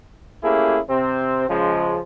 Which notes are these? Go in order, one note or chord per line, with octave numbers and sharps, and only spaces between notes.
A3 A#3 C#4 E4 G4 G#4
C3 C4
C#3 F3 G#3